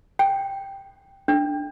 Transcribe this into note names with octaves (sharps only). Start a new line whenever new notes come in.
G5
D4